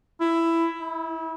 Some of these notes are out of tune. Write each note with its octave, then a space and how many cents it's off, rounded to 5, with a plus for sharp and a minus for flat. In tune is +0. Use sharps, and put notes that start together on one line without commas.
E4 +10
E4 -30